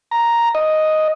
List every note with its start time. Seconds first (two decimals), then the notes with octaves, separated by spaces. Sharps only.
0.11 A#5
0.55 D#5